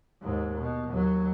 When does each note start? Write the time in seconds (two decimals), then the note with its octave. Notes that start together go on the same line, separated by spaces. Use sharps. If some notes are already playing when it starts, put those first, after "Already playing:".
0.22 D#2 G#2
0.60 B2
0.90 D#2 F#3